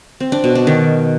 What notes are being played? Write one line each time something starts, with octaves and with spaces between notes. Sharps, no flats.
C4
D4
B2
D4
D#3